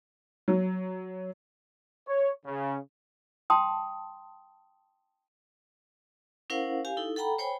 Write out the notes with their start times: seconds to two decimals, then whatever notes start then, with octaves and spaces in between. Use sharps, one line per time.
0.48 F#3
2.07 C#5
2.45 C#3
3.50 G5 A5 C6 D#6
6.50 C#4 E4 A#4 C5 F5 F#5
6.85 G4 F5 G#5
6.97 D#4 E4 A4
7.16 A4 F#5 G5 A#5 B5
7.39 C5 C#5 G5 G#5 B5